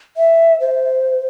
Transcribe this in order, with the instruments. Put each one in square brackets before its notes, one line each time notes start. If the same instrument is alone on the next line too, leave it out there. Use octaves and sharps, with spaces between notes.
[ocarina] E5
C5